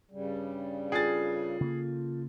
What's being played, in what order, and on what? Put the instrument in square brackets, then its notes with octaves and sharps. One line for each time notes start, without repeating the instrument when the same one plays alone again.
[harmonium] G2 C#3 G3
[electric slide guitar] F4 A4 G5 [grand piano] G#4 A6
[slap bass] C#3 A#3